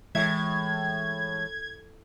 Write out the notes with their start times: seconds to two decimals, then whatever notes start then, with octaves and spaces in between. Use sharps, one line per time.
0.15 A2 E3 G#3 E5 G#6